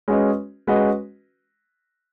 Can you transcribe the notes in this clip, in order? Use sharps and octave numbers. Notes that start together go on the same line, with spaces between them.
G#3 C#4 F#4 B4 D#5
G#3 C#4 F#4 B4 D#5